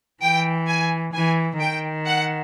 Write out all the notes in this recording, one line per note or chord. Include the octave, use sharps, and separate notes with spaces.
E3 G5
G#5
E3 G#5
D#3 G5
F#5